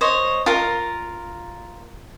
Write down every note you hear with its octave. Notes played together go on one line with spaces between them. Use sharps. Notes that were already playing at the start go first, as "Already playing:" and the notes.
C5 C#5 D#5
F4 A#4